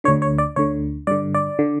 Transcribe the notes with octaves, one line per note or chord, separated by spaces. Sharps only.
D2 D3 C#5
C#5
D5
D2 D3 C#5
G2 D3 D5
D5
D3